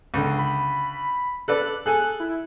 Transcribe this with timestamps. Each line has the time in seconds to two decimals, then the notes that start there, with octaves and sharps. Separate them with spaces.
0.14 C#2 D3
0.39 B5
1.48 A4 B4 D5 F#6
1.86 G#4 A4 G#5 F#6
2.20 E4